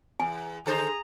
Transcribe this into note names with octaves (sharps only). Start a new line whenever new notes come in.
E2 G#5
D3 G#4 A4 C5 A#5